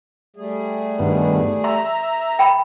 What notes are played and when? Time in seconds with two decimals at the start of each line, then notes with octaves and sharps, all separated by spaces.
0.36 G3 A3 G#4
0.99 G2 D#3 B3
1.64 E5 A#5 C6
2.39 G5 B5